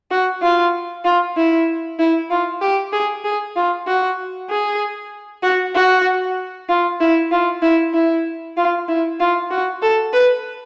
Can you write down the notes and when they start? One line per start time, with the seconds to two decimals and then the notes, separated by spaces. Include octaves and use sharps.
0.11 F#4
0.42 F4
1.05 F4
1.37 E4
1.99 E4
2.30 F4
2.61 G4
2.93 G#4
3.24 G#4
3.56 F4
3.87 F#4
4.50 G#4
5.43 F#4
5.75 F#4
6.69 F4
7.01 E4
7.31 F4
7.62 E4
7.94 E4
8.57 F4
8.88 E4
9.20 F4
9.51 F#4
9.82 A4
10.13 B4